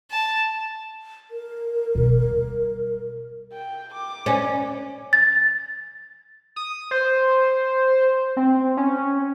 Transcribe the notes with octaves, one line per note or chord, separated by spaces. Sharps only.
A5
A#4
B2 G3
G5
D6
C#4
A6
D#6
C5
C4
C#4